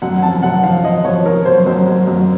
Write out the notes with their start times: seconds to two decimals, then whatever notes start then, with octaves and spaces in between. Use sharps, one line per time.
0.02 F#2 F#5
0.22 F3 A5
0.43 F#2 F#5
0.63 F3 F5
0.84 F3 D#5
1.05 F3 C#5
1.25 F3 A#4
1.45 F#2 C5
1.66 F#2
1.86 F#2
2.07 F#2